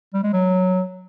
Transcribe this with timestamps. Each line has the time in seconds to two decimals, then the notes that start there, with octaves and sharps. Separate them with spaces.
0.14 G3
0.24 G#3
0.33 F#3